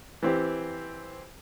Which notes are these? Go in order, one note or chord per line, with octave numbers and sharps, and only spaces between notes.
E3 C4 G4